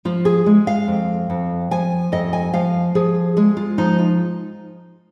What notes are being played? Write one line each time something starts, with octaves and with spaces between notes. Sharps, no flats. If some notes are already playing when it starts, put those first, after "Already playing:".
F3 F4
G#4
G#3
F5
F2
F2
F3 G#5
F2 D#5
G#5
F3 F5
F3 G#4
G#3 G#4
F4
F3 D#4
F4